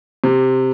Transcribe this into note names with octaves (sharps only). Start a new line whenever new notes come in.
C3